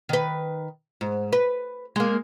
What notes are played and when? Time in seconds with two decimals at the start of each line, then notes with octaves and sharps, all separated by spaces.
0.09 D#3 B4
1.01 G#2
1.33 B4
1.96 G#3 A#3